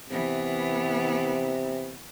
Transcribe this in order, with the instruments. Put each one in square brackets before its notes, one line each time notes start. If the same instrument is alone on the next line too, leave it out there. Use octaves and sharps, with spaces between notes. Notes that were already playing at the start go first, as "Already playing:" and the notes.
[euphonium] C3 [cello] E3 B3